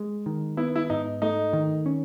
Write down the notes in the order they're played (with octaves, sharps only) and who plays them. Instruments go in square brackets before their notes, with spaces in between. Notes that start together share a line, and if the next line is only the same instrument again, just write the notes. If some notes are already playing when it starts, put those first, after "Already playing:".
Already playing: [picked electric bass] G#3
D#3
[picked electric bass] B3 [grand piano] E4
[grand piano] E4
[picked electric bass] G#2 [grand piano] D#4
[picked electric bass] A3 [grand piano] D#4
[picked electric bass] D#3
C#4